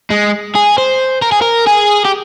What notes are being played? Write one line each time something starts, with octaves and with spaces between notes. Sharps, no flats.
G#3
G#4
C5
A#4
G#4
A#4
G#4
G4